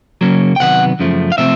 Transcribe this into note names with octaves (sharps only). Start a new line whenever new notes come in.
C#3 F#3 A#3 C#4
G5
C3 D#3 F#3 B3 F#5
F#2 C#3 F3 A3
F5
C3 F3 A3 C4 E5